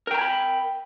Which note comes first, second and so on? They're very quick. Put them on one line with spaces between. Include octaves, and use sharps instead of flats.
A#4 G5 A#5 G#5 B5